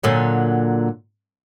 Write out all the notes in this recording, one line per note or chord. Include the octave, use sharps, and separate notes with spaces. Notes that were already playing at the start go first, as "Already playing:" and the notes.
A#2 D3 F#3